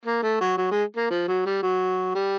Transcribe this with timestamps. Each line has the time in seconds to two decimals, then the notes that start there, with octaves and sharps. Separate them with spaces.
0.05 A#3
0.23 A3
0.41 F#3
0.57 F#3
0.71 G#3
0.97 A#3
1.10 F3
1.28 F#3
1.45 G3
1.63 F#3
2.15 G3